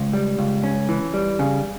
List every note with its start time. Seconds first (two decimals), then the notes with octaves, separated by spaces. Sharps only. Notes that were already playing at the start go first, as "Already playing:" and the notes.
Already playing: C#2
0.13 G3
0.39 C#2
0.64 C#4
0.89 E3
1.14 G3
1.39 C#3